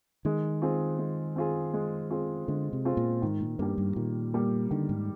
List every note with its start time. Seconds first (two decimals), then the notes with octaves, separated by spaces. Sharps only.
0.25 D#3 G#3
0.62 C4 F4 G#4
0.99 G#3
1.36 C4 F4 G#4
1.74 G#3
2.10 C4 F4 G#4
2.48 D3 G#3
2.73 C3
2.85 C4 F4 G#4
2.97 A#2
3.22 G#2 D#3
3.41 A#2
3.59 G2 G3 A#3
3.78 G2
3.96 A#2 D#3
4.34 G3 A#3
4.71 D3 D#3
4.89 G#2